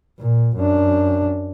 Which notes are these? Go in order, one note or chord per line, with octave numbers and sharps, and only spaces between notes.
A#2
F#2 D4